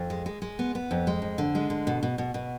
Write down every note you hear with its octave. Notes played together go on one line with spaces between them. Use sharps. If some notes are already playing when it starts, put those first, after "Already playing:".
Already playing: F2
G#3
G#3
G#3
B3
B3
F2
G#3
F2
D3
G#3
D3
B2
B2
B2
B2